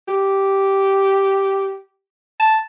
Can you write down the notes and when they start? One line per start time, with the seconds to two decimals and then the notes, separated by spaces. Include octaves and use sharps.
0.08 G4
2.40 A5